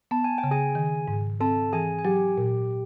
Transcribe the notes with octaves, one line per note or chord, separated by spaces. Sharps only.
B3 A5
G#5
G5
C#3
G#4 G#5
D#3
G#2
C4 A4 A5
E3 G#4 G#5
G#5
F#3 G4 G5
A#2